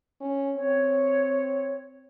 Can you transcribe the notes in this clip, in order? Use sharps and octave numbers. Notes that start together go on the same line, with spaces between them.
C#4
C4 C#5